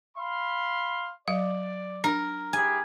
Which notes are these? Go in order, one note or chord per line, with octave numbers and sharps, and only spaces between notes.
F5 B5 C6
F#3 D5 F5
D4 A#4
E4 G4 G#4 G#5